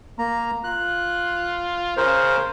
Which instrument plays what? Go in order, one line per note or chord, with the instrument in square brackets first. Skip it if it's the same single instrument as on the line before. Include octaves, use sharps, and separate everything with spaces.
[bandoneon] A#3 A#5
[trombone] F4 [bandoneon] F#6
[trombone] C#3 [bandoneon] A#4 C5